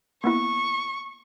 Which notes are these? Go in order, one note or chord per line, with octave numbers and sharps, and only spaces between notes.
A#3 B3 E4 C#6